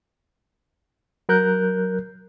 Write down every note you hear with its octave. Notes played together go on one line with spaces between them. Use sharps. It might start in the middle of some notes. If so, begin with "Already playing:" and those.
F#3 A#4 F#6 G6